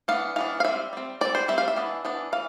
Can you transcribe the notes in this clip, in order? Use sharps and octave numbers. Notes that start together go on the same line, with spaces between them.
E3 B3 D4 F5
E3 B3 D4 F5
F5
G3 C4 E5
G3 C4
G3 C4 D5
C5
G3 C4 E5
F5
E5
E3 B3 D4
E3 B3 D4
E3 F5